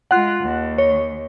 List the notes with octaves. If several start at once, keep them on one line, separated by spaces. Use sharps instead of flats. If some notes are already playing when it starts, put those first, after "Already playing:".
G#3 F4 F#5 F#6
D#2
C#5